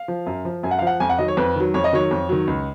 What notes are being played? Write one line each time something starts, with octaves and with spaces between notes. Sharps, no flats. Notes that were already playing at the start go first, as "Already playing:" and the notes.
Already playing: F5
F3
F#2
F3
F#2 G#5
F#5
F5
F3 F#5
F2 G#5
F#5
D#3 F#3 D#5
C#5
F2 B4
D#3 F#3
F2 C#5
D#5
D#3 F#3 C#5
F2
D#3 F#3
C#2